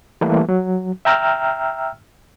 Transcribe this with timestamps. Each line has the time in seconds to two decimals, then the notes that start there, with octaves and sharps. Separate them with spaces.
0.21 E3 G3 A3 A#3
0.49 F#3
1.05 E5 G5 A#5 E6 F6